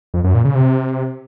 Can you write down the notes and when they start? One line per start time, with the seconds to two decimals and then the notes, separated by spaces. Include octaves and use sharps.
0.14 F2
0.24 F#2
0.34 A#2
0.45 C#3
0.55 C3